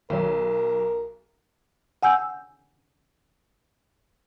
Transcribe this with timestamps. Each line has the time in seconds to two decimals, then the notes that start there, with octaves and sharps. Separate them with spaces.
0.10 B1 D#3 F#3 A#4
2.03 F#5 G#5 E6 G6